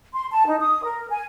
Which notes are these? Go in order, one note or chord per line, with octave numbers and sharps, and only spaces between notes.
C6
A5
D#4
D#6
A#4
G#5